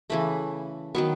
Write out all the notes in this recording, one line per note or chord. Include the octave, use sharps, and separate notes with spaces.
C#3 E3 A3 B5
D#3 F#3 B3 C#6